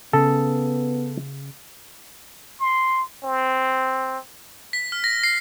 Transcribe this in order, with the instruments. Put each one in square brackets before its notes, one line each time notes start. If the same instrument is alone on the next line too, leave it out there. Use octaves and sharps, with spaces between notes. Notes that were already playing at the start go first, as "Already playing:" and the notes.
[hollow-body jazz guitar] C#3 [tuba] B3 [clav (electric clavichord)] A4
[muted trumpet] C6
C4
[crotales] B6
F6
A#6
C7